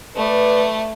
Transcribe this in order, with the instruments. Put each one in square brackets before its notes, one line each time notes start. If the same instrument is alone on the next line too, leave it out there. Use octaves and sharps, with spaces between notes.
[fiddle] A3 [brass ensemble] B4 D5